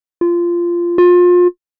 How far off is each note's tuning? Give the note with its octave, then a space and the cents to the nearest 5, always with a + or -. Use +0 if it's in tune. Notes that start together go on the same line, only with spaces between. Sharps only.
F4 -15
F4 +30